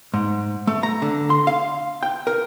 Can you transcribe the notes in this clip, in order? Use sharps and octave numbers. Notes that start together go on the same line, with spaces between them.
G#2
A3
A#5
D3
C6
F5
G5
A#4